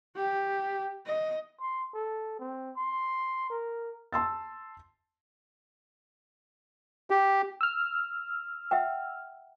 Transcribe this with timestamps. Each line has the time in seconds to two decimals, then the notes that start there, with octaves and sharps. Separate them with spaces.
0.16 G4
1.07 D#5
1.61 C6
1.94 A4
2.40 C4
2.77 C6
3.50 A#4
4.13 A5 C6 E6 A6
7.10 G4
7.61 E6 F6
8.71 E5 F#5 G5